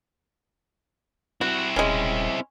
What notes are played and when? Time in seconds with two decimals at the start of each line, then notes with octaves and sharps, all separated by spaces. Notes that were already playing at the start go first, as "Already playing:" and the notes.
1.41 C4 E4 F#4
1.76 D#1 G#3 C#4